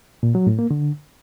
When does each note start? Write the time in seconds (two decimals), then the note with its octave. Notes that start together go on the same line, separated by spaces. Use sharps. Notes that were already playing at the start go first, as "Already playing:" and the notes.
0.23 A#2
0.35 F#3
0.47 A2
0.59 A#3
0.71 D3